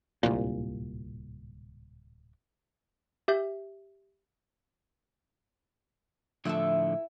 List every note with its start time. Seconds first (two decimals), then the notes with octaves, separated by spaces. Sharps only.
0.23 D1 C2 A#2
3.28 G4 E5 G6
6.45 A2 D3 F3 E4 F4 A4